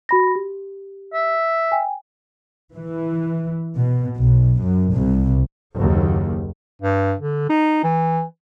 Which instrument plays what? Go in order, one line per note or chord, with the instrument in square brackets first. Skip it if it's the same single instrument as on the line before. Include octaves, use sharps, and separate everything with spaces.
[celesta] F#4 B5 A#6
G4
[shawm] E5
[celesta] G5 G#5
[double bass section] E3
B2
B1
F#2
C2
F#1 D#2
[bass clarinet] G2
D3
D#4
E3